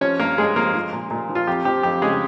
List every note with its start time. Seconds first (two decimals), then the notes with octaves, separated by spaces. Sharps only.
0.01 F3 C#4 C#5
0.19 G2 A#3 A#4
0.38 G2 G#3 G#4
0.56 F3 A#3 A#4
0.74 F3
0.93 A#2
1.10 A#2
1.29 F3
1.35 F4
1.47 F2 G4
1.65 F3 G4
1.83 F2 G4
2.02 C#3 G#3 G#4